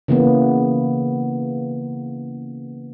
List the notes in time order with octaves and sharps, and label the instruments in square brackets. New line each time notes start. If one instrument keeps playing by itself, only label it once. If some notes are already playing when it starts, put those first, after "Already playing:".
[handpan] C#3 E3 A#3 B3